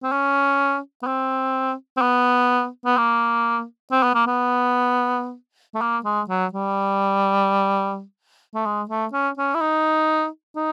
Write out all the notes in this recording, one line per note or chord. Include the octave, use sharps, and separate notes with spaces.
C4
C#4
B3
C4
C4
B3
B3
A#3
C4
B3
A#3
B3
A3
A#3
G#3
F#3
G3
A3
G#3
A3
C#4
C#4
E4
D#4
D#4